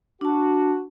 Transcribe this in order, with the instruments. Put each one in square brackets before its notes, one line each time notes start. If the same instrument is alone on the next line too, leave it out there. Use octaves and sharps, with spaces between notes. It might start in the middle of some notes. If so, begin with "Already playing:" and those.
[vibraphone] D4 A5 [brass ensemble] F#4